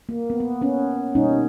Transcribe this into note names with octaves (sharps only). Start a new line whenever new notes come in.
A#3
B3
B3
B3 C#4
B2 G3 A#3 C#4 D#4